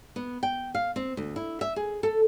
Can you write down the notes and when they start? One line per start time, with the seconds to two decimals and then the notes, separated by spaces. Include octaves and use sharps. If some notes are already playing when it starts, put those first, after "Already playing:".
0.16 B3
0.43 G5
0.75 F5
0.96 C4
1.17 D2
1.36 E4
1.61 E5
1.76 G#4
2.03 A4